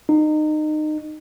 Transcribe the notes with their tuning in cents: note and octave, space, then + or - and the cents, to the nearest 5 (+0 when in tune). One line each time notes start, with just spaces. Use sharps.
D#4 -25